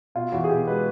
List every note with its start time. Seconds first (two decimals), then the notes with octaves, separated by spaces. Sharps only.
0.15 B2 F4
0.32 E2 F#4
0.44 G#4
0.49 B2 G4
0.67 G#3 B4